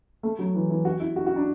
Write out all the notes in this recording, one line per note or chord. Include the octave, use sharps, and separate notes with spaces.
A3
F#3
E3
E3
F#4
E4
F#4
F#4
D4